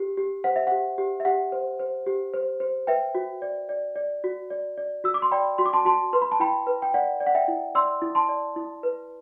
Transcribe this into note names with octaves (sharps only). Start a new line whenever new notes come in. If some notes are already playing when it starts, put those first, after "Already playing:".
Already playing: G4
G4
C5 F#5
E5
G4 F#5
G4
E5
G4 F#5
C5
C5
G4
C5
C5
B4 E5 G5
F#4
D5
D5
D5
F#4
D5
D5
F#4 E6
D6
C6
D5 G5 B5
F#4 C6
D6
A5 C6
F#4 A5 C6
B4 C6
B5
A5
E4 G5 B5
B4
G5
D5 F#5
D5
F#5
E5 G5
E4
D5 C6 E6
E4
A5 C6
D5
E4
B4